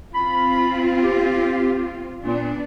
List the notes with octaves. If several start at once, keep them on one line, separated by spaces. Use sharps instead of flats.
C4 F4 B5
G4
A#2 B3 D4